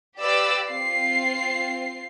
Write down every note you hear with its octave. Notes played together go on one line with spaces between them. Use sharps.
G4 B4 D5 F5 E6
C4 F4 C7